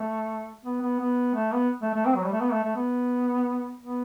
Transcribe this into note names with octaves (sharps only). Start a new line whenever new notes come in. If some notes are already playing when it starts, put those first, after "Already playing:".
Already playing: A3
B3
B3
B3
A3
B3
A3
A3
C4
F#3
G3
A3
B3
A3
A3
B3
B3